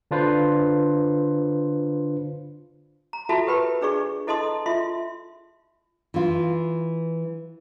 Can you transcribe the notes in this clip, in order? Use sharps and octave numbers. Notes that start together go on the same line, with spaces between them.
D3 D4 F4 B4 C5
A#5
F4 F#4 A4 E5 A5 B5
G4 A#4 B4 G5 B5
D4 G#4 D5 C#6
E4 A4 D#5 A5 C6 D#6
F4 E5 C6
E3 F4